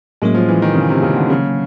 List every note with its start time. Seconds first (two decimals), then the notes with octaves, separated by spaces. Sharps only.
0.22 A2 F#3 G#3 A#3 C#4
0.35 F3
0.49 E3
0.62 D#3
0.75 C#3
0.89 C3
1.02 C#3
1.16 D3
1.30 C#3